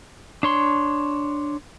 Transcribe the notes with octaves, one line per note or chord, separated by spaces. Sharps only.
D4 C#5 C6